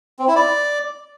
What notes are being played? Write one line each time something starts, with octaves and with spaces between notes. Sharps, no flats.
C4
E4
D5